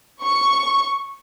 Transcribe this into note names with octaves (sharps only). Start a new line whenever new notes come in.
C#6